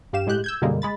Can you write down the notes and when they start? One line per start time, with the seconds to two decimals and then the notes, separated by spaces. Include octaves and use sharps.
0.13 G2 G4 F5 E7
0.27 A2 G#3 G4 F#6 G6
0.44 E6 G6 G#6
0.62 F#2 B2 D3 G3 G#3 A#3
0.82 G#3 B5 A6